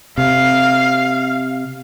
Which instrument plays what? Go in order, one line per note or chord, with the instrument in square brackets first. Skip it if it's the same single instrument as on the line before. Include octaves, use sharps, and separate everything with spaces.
[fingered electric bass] C3 [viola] F5